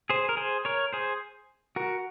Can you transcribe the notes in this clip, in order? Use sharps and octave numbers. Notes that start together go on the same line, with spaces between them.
G#4 C5
A#4
G#4 C5
A#4 C#5
G#4 C5
F#4 A#4